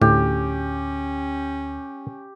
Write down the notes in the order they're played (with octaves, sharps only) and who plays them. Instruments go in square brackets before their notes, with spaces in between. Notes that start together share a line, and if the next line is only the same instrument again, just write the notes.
[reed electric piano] D2 [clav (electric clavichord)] A2 [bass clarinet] C#4 [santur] G4